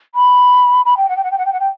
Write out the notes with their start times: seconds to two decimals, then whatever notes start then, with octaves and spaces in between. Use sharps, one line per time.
0.15 B5
0.85 B5
0.97 G5
1.09 F#5
1.17 G5
1.24 F#5
1.31 G5
1.38 F#5
1.46 G5
1.53 F#5
1.60 G5